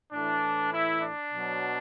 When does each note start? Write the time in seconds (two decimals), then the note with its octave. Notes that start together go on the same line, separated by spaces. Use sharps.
0.13 A2 E3 D4
0.73 E4
1.02 D4
1.32 B2 F#3